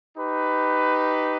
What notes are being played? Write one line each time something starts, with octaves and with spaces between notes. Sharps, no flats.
D#4 G4 B4